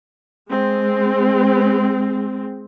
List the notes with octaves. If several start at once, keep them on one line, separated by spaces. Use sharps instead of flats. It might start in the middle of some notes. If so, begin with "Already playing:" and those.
G#3 C4